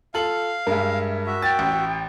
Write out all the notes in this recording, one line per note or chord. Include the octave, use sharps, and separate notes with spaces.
F4 A4 F5 F#7
G2 G#3 A#4 E5
F#4 E5
G5 A6
A1